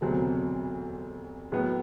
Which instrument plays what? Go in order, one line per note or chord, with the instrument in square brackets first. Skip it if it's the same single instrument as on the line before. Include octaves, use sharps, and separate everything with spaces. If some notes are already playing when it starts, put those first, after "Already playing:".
[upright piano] E1 D2 C3 F#3 C4
A2 F#3 B3